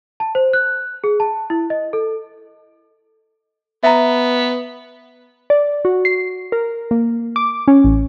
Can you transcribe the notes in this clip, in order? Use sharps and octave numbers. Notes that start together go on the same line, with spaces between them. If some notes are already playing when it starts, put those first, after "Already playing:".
A5
C5
F#6
G#4
A5
E4
D#5
A4
B3 E5 A#5
D5
F#4
C7
A#4
A#3
D6
C#4
A1